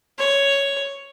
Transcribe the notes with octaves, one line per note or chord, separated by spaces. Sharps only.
C#5